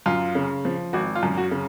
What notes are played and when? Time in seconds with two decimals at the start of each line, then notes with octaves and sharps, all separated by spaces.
0.06 F#2 F4
0.35 C#3
0.65 F3
0.93 G#1 F#4
1.15 F4
1.23 F#2
1.38 F#4
1.51 C#3